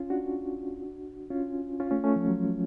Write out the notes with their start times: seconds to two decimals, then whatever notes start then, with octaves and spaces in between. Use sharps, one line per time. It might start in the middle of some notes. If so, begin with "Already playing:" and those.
Already playing: C#4 F4
0.10 D4 F#4
1.30 C#4 F4
1.80 C#4 F4
1.91 A3 C#4
2.04 A3 C#4
2.16 F3
2.28 F#3